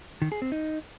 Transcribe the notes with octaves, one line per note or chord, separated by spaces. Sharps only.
D#3
G#4
C4
D#4